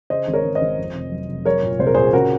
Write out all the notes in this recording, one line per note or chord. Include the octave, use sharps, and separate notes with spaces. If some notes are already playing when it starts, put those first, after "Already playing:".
C#3 C5 D#5
G#1
A#4 C#5
G#1
C5 D#5
G#1
F2
F1
F#3
F1
F#3 A#4 C#5
A#2
C2 C5
A#4
A#2 G#4 C5
C#3 F#4 A#4